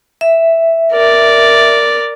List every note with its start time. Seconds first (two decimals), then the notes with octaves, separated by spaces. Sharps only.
0.21 E5
0.93 A#4 D5